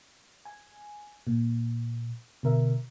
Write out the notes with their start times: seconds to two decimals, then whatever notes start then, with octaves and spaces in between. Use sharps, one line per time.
0.45 G#5
1.27 A#2
2.43 B2 D3 A#4 E5